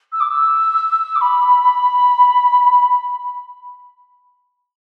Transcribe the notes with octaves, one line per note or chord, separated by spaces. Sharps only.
E6
D6
E6
D6
B5